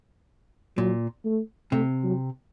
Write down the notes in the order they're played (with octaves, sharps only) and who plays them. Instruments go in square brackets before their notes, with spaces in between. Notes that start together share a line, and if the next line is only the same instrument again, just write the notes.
[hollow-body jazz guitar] A#2 [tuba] F#3
[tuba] A3
[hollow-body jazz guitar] C3 [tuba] A3
[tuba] F#3